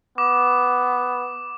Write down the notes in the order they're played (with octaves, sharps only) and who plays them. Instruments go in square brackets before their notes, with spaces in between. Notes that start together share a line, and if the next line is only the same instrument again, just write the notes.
[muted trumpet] B3 [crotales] D6